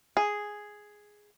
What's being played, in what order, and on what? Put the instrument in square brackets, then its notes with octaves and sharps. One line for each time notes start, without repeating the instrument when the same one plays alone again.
[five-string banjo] G#4